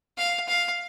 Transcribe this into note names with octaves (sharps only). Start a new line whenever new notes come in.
F5
F5